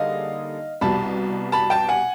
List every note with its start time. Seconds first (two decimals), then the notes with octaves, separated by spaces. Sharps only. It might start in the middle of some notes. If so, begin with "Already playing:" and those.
Already playing: D3 G3 A#3 D#4 G#4 D#5 F5
0.81 C2 B2 G3 A5 B5
1.52 A5 B5
1.70 G5 A5
1.89 F#5 G#5